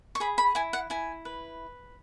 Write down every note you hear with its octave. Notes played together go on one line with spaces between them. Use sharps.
C#6
G#4 B5
B5
E4 G#5
F#5
E4 G#5
B4